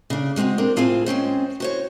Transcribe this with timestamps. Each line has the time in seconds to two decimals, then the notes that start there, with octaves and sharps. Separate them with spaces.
0.10 C#3 D4
0.36 G3 G#3 C4 F#4 G#4
0.58 C4 D4 A#4
0.76 A2 C4 F4 G#4 G#5
1.06 G#3 C4 C#4 C5
1.60 F#4 C5 C#5